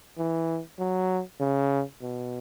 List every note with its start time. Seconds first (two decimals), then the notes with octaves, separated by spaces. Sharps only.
0.18 E3
0.79 F#3
1.40 C#3
2.01 B2